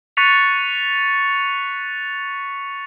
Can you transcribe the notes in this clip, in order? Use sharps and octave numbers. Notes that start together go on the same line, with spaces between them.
C#6 F#6 A6 B6 C#7 F7